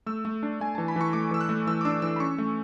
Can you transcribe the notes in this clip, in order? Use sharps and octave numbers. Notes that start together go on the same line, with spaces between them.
A3 E6
A3
D4
A3 G#5
E3 A5
B5
E3 C#6
A3 D6
E3 E6
F#6
A3
E3 E6
D6
D4 E6
E3 E6
B5
C#4 C#6
A3